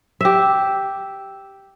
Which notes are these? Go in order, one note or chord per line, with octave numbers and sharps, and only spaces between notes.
G4 E5